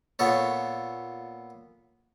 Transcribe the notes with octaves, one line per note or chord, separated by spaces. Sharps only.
A#2 B3 A4 C#5